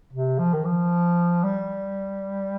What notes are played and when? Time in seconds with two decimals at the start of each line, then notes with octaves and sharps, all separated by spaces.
0.13 C3
0.39 F3
0.53 D#3
0.65 F3
1.44 G3